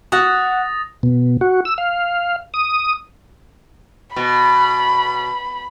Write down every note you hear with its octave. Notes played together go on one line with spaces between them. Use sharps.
F#4 F#5 D#6 A6 A#6
B2
F#4
E6
F5
D#6
B2 B5